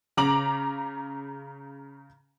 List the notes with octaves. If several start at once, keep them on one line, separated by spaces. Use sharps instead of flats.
C#3 A#5 D6 F#7